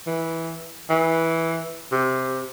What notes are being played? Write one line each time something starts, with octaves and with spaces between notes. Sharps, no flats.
E3
E3
C3